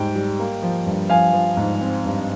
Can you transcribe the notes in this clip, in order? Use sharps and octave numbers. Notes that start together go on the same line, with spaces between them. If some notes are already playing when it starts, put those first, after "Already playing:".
Already playing: G#2 G3 G5
G3
A#3
F3
G2
F3 F5 G#5
F3
G#2
C4
G2